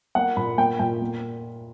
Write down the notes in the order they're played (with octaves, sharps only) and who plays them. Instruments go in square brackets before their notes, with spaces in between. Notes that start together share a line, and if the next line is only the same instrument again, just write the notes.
[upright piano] A#3 F#5
A#2 B5
A#3 G5
A#2 G5
A#3